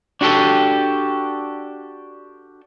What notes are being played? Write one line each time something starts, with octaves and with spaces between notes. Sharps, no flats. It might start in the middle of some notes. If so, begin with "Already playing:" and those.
D4 F#4 G4 A4